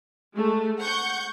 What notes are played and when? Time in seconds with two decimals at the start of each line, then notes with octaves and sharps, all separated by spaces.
0.34 G#3 A3
0.80 F#5 C#6 G6